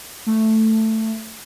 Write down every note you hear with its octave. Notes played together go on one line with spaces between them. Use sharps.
A3